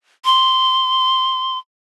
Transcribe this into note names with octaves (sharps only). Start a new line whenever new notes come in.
C6